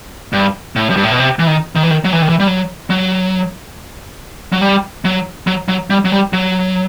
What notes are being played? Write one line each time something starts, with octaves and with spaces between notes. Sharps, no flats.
G2
A2
F#2
G2
A2
B2
C3
E3
D#3
D#3
E3
D#3
F#3
E3
D#3
E3
G3
F#3
F#3
F#3
G3
F#3
F#3
F#3
G3
F#3
G3
F#3